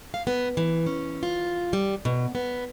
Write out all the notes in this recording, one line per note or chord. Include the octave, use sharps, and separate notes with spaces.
F5
B3
E3
C#4
F4
G3
B2
B3